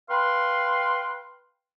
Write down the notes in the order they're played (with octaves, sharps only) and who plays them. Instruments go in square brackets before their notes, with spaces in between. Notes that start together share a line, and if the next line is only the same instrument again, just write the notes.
[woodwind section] B4 F5 G5 C6